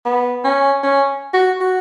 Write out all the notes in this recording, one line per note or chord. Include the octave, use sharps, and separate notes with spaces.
B3
C#4
C#4
F#4
F#4